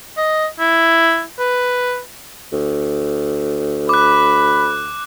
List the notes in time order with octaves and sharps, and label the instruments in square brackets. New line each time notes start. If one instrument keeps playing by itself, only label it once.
[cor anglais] D#5
E4
B4
[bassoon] D2
[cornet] B5 [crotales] D6 F#6